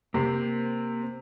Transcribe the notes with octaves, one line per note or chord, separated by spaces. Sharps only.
C3 A#3 C4 C5